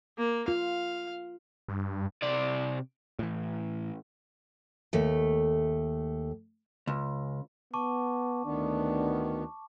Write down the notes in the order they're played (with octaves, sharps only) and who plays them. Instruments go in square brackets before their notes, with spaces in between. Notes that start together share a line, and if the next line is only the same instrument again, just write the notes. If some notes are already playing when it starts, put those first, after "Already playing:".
[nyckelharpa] A#3
[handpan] F4 [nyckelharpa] F5
[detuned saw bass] G2
[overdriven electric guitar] C3 D5
[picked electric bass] A2 E3
[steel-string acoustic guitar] D#2 A3
[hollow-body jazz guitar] C#2
[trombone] B3 [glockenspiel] A5 C#6 D6
[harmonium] D2 D#3 B3 [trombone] D4